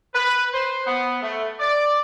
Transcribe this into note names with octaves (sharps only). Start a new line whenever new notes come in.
B4
C5
B3
A3
D5